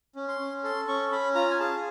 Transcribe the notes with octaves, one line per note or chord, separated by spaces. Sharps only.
C#4
C6
C#4
A4 C6
C#4 C#6
C#4 B5
F4 A#5
G#5
G#4 A5